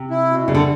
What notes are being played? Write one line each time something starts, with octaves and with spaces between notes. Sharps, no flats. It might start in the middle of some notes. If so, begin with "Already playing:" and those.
Already playing: C3
E4
B2
C#3 G3
D3